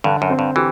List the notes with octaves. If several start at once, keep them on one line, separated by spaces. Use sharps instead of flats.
G2 D3
F#2
C4
G2
E3 G4